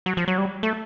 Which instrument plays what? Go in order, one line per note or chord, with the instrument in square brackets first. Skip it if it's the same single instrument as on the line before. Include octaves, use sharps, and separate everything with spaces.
[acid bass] F#3
F3
F#3
G3
A3